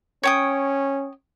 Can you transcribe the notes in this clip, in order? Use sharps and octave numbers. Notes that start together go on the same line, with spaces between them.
C#4 C#5 G5 D#6